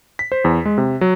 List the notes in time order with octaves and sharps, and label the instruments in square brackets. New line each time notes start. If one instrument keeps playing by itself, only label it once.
[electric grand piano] B6
C5
E2
G#3
C3
F#3